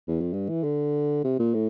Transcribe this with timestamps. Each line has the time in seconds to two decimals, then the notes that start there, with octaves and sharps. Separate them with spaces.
0.08 E2
0.21 F2
0.33 G2
0.49 E3
0.63 D3
1.24 C3
1.39 A#2
1.54 A2